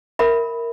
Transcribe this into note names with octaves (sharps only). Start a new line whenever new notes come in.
A#4 E5 B5